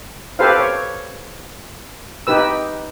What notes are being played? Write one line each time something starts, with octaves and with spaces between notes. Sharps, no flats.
G4 A4 B4 C5 F5
C#5
D#4 G4 B4 E6